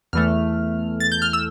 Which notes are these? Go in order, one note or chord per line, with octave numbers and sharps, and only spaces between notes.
E2 E3 A3 F6
A6
G6
F6
E6